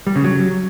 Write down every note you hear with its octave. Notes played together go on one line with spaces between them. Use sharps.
G3
C#3
F#3